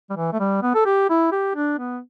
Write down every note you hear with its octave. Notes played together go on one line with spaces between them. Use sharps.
G3
E3
A3
G3
B3
A4
G4
E4
G4
D4
B3